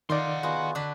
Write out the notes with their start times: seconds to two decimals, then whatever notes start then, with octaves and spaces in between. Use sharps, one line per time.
0.10 D#3 D#4 F4 D5 F#5 C6
0.43 B3 F4 F#4 G#4
0.75 D3 D4 B4